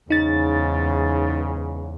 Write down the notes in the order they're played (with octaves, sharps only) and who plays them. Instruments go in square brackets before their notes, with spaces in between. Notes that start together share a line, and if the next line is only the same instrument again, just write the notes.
[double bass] E2 [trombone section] G#2 C#3 [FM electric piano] D#4 A6